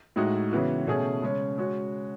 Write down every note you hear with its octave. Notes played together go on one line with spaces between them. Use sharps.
A2 G#3 D#4 F#4
C#3 E3 B3 F#4
B2 A3 C#4 G#4
C#3 G#3 C#4
G#3 C#4 F#4